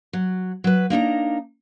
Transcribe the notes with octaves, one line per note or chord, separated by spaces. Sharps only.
F#3
F#3 B4
A#3 D4 D#4 A#5